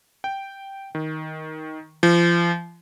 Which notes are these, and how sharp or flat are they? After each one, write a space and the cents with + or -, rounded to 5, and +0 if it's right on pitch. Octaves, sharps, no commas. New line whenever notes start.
G5 -5
D#3 +10
F3 -30